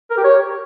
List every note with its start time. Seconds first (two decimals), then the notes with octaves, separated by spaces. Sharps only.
0.11 A#4
0.18 G4
0.24 C#5